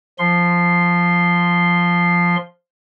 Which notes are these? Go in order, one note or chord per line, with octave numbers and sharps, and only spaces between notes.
F3 C6